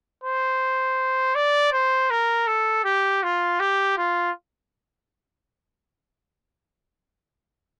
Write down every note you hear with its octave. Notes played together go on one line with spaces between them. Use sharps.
C5
D5
C5
A#4
A4
G4
F4
G4
F4